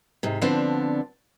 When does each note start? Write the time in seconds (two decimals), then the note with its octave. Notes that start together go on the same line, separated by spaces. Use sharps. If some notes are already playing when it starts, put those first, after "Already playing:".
0.23 G#2 C3
0.41 D3 F3 B3 C4 D4